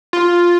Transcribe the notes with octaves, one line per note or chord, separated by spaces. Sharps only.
F4